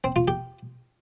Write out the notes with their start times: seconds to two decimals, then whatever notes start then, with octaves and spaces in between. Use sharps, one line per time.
0.04 C4
0.16 F4
0.28 G4